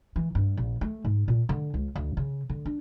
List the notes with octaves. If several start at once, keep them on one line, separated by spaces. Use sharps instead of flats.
E3
G2
A#1
A3
G#2
A#2
D3
C#2
D2
C#3
D3
D4